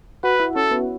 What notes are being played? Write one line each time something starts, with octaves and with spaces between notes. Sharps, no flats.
F#4 B4 F#5
E4 E5
C#4 A4 C#5
B3 B4